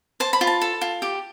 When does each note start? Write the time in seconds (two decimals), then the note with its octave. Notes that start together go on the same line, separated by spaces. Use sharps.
0.20 C5 A5
0.33 B5
0.41 F4
0.47 A5
0.62 A4
0.81 F4
1.02 G4